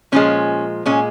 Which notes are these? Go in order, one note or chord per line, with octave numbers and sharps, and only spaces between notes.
A#2 F3 G#3 C#4
A#2 G#3 C#4